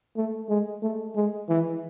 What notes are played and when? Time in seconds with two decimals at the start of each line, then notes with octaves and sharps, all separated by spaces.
0.16 A3
0.49 G#3
0.83 A3
1.16 G#3
1.49 E3